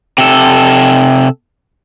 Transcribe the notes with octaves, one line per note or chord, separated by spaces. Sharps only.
C3 A4